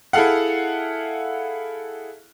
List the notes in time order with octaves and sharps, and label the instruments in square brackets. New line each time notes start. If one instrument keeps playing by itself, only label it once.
[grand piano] E4 G#4 A4 F5 F#5